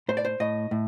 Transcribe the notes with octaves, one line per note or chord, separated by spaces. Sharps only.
A2 C5
D5
C5
A2 D#5
A2